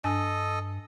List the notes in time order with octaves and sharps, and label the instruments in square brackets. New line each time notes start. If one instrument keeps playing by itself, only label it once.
[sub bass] G2 [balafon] D4 G#5 [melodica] A4 D#5